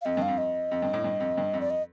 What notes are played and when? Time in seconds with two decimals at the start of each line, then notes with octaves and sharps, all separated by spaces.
0.02 F5
0.05 F2 D#5
0.17 G2 F5
0.28 F2
0.38 D#5
0.71 F2
0.82 G2
0.93 A2
1.04 G2
1.20 F2
1.37 G2
1.54 F2
1.61 D5
1.70 D#5